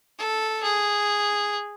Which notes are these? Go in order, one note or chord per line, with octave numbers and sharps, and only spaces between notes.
A4
G#4